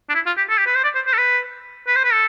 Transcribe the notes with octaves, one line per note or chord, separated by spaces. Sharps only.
D4
E4
F4
G4
A4
G4
B4
C5
D5
C5
C5
A4
B4
B4
C5
B4
A4